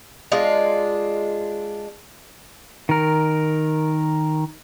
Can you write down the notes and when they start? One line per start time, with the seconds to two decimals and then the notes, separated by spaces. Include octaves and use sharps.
0.32 G#3 D4 F4
2.89 D#3 A#4